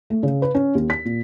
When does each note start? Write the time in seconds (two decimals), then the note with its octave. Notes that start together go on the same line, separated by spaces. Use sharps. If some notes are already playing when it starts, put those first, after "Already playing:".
0.10 A3
0.23 C#3
0.42 B4
0.55 C#4
0.75 D#2
0.90 B6
1.05 A#2